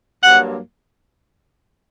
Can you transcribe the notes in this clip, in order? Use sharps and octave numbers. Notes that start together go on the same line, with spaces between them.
G2 F#3 A#3 F#5